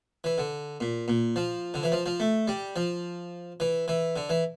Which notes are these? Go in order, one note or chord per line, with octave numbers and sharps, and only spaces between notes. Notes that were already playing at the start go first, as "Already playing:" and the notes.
E3
D3
A#2
A#2
F3
D3
E3
F3
F3
A3
G3
F3
E3
E3
D3
E3